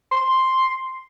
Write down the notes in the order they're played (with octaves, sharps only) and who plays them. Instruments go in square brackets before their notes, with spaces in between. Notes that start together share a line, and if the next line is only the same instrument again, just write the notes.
[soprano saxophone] C6